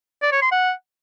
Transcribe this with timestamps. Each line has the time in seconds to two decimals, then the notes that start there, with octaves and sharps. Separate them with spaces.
0.22 D5
0.32 C#5
0.42 C6
0.52 F#5